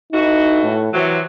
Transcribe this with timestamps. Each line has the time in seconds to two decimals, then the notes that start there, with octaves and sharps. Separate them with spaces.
0.13 E3 A3 D#4 F#4
0.64 A2
0.93 C3 E3 F#3